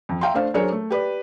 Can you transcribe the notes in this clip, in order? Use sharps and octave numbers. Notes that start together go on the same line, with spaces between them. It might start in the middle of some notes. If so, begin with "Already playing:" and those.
F2
E5 F5 G5 A#5 C6
A3 D4 C5 F5
F#3 D4 G#4 A#4 C5 C#5
A3
G4 B4 D5